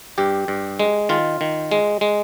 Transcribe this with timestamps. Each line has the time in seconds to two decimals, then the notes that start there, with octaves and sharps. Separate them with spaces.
0.18 G2 G4
0.48 G2
0.80 G#3
1.09 D#3 F4
1.41 D#3
1.71 G#3
2.01 G#3